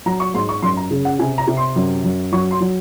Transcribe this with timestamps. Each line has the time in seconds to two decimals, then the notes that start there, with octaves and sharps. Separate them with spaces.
0.06 F#3 A#5
0.20 C#6
0.34 G#2 C6
0.49 C#6
0.62 F#2 C6
0.77 A#5
0.91 C#3
1.05 F#5
1.19 C3 G#5
1.38 A#5
1.47 C3
1.57 C6
1.76 F#2
2.04 F#2
2.32 F#3 C#6
2.51 C6
2.61 F#3